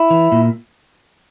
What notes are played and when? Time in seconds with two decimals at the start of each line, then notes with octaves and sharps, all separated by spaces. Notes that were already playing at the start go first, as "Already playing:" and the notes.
Already playing: E4
0.10 E3
0.32 A#2